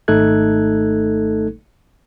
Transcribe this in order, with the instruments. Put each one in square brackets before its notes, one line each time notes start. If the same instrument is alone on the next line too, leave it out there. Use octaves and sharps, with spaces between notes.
[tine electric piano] G#1 A3 D#4 A4 F#6 G#6